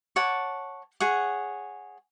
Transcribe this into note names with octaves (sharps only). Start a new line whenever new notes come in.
C#5 F#5 A5 D6
G#4 C#5 F#5